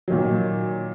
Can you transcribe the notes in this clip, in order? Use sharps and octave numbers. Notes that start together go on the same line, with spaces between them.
A#2 D#3 F#3